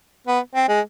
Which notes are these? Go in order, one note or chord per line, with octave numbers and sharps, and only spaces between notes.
B3
C4
G#3